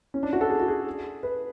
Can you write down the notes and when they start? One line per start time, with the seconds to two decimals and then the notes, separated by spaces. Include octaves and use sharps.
0.14 C#4
0.23 D4
0.33 F#4
0.41 A4
0.50 G#4
0.60 F#4
0.68 G#4
1.23 B4